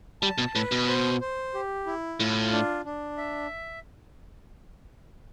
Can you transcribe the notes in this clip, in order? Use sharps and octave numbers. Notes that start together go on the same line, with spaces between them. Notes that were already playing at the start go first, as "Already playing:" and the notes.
G3 A5
B2
A2 B4
B2
C5
C5
G4
E4
A2 F4
D4
D4
E5